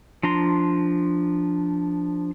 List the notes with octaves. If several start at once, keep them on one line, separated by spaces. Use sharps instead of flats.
F3 D4 A#5 C6